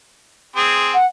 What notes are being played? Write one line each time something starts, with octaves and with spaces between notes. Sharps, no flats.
C4 G#4
F#5